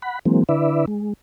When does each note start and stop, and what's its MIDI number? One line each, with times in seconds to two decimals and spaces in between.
0.02 0.19 78
0.02 0.19 83
0.25 0.43 52
0.25 0.43 54
0.25 0.43 56
0.25 0.43 58
0.25 0.43 60
0.49 0.86 50
0.49 0.86 64
0.49 0.86 71
0.49 0.86 74
0.49 0.86 76
0.87 1.13 56